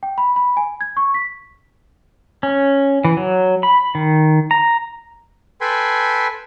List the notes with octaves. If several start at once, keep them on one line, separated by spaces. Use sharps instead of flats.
G5
B5
B5
G#5
G#6
C#6
B6
C#4
E3
F#3
B5
D#3
A#5
A4 B4 G5 G#5 B5 C6